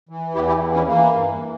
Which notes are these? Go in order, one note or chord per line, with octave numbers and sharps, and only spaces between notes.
E3
E2 E4 G4
E4 G4
E3
C#4 E4
E3 A#3
G2